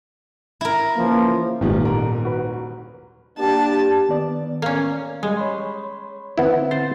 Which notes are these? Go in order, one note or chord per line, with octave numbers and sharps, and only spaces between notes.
E4 A#4
C#3 E3 F3 A#3
G#1 E2 A#2 D#3 G3
D#1 G#2 A#4
F#4 B4
A#3 D4 G4 A5
D#3 B3 D5
A#3 C#4
G3 G#3
C#5 B5 C6
D3 B3 C4 E4
C5 A6